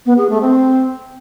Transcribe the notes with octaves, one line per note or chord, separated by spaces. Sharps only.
B3
G#4
A3
C4